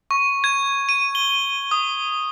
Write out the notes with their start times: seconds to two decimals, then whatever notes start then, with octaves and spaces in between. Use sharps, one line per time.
0.11 C#6
0.44 G#6
0.89 D#7
1.15 G7
1.71 D#6